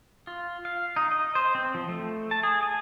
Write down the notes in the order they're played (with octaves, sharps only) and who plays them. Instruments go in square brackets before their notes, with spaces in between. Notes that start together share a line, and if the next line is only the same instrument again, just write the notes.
[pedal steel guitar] F4
F5
D#4
D#5
C5
C4
F3
A3
A5
G#4
G#5